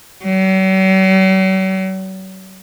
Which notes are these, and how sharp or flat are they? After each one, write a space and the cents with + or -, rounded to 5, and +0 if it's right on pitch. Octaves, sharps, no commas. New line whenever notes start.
F#3 +45